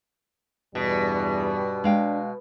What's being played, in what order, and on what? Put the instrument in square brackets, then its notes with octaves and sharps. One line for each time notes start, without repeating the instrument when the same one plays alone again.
[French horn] E2 [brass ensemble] G2 G3 [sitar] B2
[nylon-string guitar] G#3 F5 G5 [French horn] D4